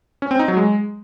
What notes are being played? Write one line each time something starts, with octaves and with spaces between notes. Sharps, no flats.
C#4
C4
D#4
F#3
G#3